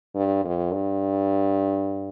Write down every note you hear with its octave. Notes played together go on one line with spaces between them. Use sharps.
G2
F2
G2